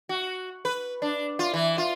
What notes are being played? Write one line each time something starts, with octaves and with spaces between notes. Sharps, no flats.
F#4
B4
D4
F4
E3
F4